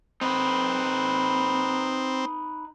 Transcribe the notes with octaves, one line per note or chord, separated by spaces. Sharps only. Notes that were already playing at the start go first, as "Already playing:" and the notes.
C4 D#4 B4